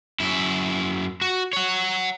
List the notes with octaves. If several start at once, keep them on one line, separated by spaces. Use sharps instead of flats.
F#2 E4
F#4
C#5 F#5